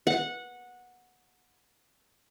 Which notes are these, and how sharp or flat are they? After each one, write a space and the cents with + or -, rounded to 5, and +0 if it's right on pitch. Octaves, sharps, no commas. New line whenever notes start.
F#5 -15